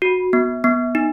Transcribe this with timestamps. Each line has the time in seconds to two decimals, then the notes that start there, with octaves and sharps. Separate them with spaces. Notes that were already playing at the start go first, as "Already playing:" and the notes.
0.02 F#4
0.33 B3
0.64 B3
0.95 D#4